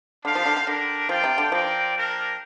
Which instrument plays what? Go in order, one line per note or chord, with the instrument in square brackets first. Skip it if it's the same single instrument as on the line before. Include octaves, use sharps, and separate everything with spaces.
[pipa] D3 [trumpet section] D4 G4 C5 F5
[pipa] F3
D3
D3
[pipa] D3 [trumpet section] D4 G4 A#4
[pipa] F3 [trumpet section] F4 D5 G5
[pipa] C3
D3
[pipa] F3 [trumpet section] C4 A#4 D5 G5
[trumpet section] A#3 D4 A#4 G5